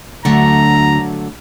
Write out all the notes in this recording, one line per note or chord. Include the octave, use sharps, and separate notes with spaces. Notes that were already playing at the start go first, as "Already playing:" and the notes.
D2 D3 F#3 A3 A#5